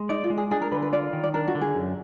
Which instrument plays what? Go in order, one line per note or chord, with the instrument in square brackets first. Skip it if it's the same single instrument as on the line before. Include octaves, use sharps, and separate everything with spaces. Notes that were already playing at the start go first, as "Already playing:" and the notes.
Already playing: [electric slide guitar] G#3
[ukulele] D#4 [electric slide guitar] D5
[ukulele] F4
[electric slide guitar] G#3
[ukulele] G#4
[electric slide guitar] D4 [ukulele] G#4
[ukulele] A#4
[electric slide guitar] D3 [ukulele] B4
[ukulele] B4
[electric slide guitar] F4 [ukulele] D5
[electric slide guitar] D#3
[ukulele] D5
[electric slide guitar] D4 [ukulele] A#4
[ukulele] F#4
[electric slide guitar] D3
[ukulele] G#4
[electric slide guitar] F#2